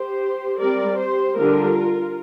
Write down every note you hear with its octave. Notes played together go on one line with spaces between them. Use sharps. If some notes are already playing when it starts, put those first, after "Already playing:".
Already playing: G4 C5
G3 C4 A#4 D5
G4 C5
D3 G3 D4 F4 A#4